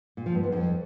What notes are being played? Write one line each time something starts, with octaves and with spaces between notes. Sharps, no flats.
A#2
F3
G2
E2
F2